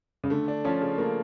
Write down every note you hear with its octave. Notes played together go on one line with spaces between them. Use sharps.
C#3
D3 A3
D4
F3 C#4
C#3
A3 A#3